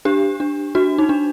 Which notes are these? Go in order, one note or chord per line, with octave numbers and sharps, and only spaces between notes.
D4 G4
D4
D4 F#4
D#4
D4